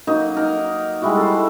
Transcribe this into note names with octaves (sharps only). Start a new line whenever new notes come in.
F#3 A#3 D#4
D#4 A#4
G3 G#3 E4 F#4
A4 C5